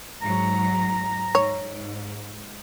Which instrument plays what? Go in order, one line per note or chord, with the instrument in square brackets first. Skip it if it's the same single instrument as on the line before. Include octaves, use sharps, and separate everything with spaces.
[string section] G#2 F#3 [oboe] A#5
[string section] G#2 [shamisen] C#5